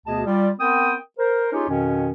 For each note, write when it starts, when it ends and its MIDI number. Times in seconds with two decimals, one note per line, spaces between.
0.07 0.21 38
0.07 0.21 47
0.07 0.21 59
0.07 0.21 68
0.07 0.21 75
0.07 0.21 81
0.25 0.49 55
0.25 0.49 65
0.59 0.95 59
0.59 0.95 60
0.59 0.95 70
0.59 0.95 79
0.59 0.95 87
1.18 1.50 70
1.18 1.50 72
1.53 1.64 61
1.53 1.64 63
1.53 1.64 65
1.53 1.64 67
1.53 1.64 68
1.53 1.64 73
1.68 2.11 41
1.68 2.11 47
1.68 2.11 51
1.68 2.11 61